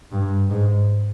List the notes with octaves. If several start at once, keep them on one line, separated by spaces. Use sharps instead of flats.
G2
G#2